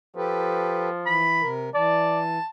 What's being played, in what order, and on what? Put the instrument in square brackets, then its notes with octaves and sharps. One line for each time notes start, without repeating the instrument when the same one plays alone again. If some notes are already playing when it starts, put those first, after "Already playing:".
[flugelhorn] F3 [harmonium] G4 A4 B4
[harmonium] E3 [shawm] B5
[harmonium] C3 A#4
[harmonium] E3 [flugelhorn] D5 [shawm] A5